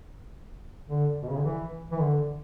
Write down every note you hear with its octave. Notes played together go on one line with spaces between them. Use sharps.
D3
B2
C#3
D3
E3
E3
D3